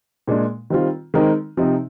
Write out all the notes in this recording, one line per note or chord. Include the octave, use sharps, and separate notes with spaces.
A#2 G#3 D4
D#3 G3 C4 F4
D#3 G#3 C4 D#4 A#4
C3 F3 C4 D#4